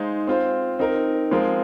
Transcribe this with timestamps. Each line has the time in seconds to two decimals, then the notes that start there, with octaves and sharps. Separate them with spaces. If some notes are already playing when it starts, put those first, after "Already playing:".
Already playing: G#3 D#4 C5 F5
0.27 C4 F4 C5
0.79 C4 D#4 A#4
1.31 F3 G#3 C4 F4 A#4